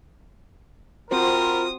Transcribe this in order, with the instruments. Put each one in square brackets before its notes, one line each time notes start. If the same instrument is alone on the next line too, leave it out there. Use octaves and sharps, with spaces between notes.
[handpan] C4 F#4 C5 [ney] F4 [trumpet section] A#4 B5 [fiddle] D#6